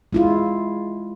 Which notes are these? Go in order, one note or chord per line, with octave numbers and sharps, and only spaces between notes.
G#3 E4 F4